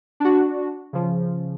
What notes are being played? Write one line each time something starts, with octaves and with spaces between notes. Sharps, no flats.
D4 F#4
C#3 F3